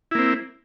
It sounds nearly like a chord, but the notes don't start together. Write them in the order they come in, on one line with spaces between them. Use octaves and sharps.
E4 A#3 C4